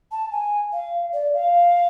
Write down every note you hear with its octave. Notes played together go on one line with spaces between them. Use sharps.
A5
G#5
F5
D5
F5